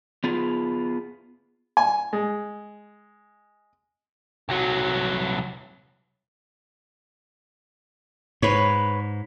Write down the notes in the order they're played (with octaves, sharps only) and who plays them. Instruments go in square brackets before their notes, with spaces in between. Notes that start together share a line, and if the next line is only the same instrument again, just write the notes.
[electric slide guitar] B3 F4 G#4
[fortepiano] G#5
G#3
[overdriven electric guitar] C2 F#3
[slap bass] G#2 [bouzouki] B4 C#5